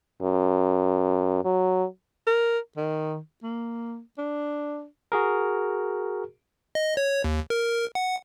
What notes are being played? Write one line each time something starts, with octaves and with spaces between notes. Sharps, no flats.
F#2
F#3
A#4
D#3
A#3
D4
F#4 G#4 A#4
D#5
C#5
D#2
A#4
F#5